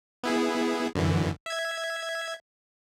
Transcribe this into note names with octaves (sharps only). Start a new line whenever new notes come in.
B3 E4 G#4
F#2 D3 E3
E5 G#6